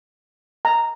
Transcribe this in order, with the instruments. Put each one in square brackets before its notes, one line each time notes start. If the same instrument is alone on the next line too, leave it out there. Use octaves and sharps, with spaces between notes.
[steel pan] A#5